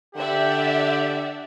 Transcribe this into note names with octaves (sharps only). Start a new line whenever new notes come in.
D3 G4 D5 E5 F#5